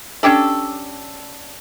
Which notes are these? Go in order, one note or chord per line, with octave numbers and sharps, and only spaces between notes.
C#4 D4 G4 A4